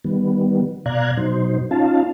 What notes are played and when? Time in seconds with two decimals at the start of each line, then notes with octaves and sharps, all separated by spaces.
0.04 D#3 G3 B3
0.86 B2 D5 F5 A#5 F#6 G#6
1.17 B2 F#3 D#4 C5
1.71 C#4 D#4 F4 F5 A5